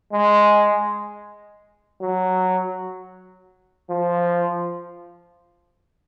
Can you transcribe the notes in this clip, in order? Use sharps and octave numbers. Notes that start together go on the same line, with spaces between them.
G#3
F#3
F3